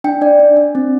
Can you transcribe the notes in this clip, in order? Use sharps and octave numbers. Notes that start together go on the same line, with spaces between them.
D4 G5
D4 D5
D4
D4
C4